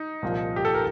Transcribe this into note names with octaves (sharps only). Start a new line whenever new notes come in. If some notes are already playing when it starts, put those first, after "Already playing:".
Already playing: D#4
C2 A#2 F3
G4
A4
A#4